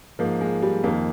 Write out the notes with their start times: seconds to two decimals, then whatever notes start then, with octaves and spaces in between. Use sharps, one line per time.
0.19 G#2 F3 A#3
0.41 G#3
0.63 G3
0.84 F2 D#3 A#3